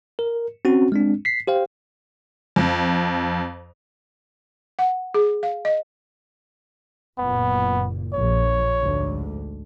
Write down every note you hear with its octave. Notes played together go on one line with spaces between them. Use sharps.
A#4
C4 C#4 F#4
G#3 C4 D4
B6 C7
G4 C5 F5 G5
F2
F#5
G#4
F5
D#5
F#1 A#2 B3
A#1 C#5
D2 G#2 D3